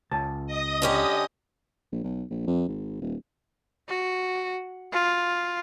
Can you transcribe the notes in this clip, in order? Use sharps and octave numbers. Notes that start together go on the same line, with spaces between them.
C#2 A5
D#5 D#6
D3 C#4 G4
A#1
B1
A#1
F2
G#1
D#1
F#4
F4